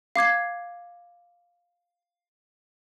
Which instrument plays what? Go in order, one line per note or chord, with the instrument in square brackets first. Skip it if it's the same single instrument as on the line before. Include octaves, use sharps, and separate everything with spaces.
[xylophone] F5 D6 G#6 C7